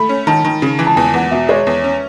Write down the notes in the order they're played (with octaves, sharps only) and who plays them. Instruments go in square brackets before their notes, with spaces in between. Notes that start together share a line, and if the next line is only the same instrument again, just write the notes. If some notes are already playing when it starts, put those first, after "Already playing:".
Already playing: [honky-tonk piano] A3 [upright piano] B5
[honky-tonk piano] C#4
[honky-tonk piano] D#3 [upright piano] A5
[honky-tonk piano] D#3
C#3
E3
[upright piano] A5
[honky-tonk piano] E2 [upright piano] G#5
[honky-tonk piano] E2 [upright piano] F#5
[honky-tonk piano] B2 [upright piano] E5
[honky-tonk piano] G#3 [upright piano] C#5
[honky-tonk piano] E2
C#4